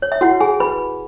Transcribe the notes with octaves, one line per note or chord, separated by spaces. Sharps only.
C#5
E5
E4 F#4 C#5 F#5
G#4 G#5
B4 B5